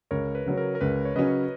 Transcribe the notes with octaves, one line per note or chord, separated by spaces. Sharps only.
C#2 A#4 C#5
B4
C#3 F#3 C#4
A#4
A#4
C#2 B4
C#5
C#3 F#3 C#4 B4 D#5